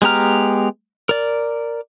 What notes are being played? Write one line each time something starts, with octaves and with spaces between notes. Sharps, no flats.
G#3 B3 G4 A#5 F6
A#4 D5